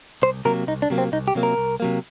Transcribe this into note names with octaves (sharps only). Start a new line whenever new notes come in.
C2 C5
C3 F#3 A#3 A#4
C2 D#4
D4
C3 F#3 A#3
C4
C2 D#4
G4
C3 F#3 A#3
A#4
C2
C3 F#3 A#3